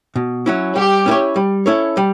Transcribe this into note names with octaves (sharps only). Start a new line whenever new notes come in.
B2
F#3 C#4 E4
G3 G4
C#4 E4 A4
C#5
G3
C#4 E4 A4 C#5
G3